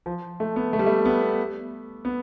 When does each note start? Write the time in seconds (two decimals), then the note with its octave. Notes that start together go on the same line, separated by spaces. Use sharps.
0.06 F3
0.40 A3
0.56 B3
0.73 A3
0.79 G3
0.86 A3
1.05 B3
2.05 B3